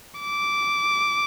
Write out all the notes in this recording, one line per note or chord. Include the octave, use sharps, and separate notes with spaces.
D6